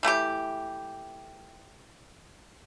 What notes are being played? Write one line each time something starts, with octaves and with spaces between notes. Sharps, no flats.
E3 A3 E4 G4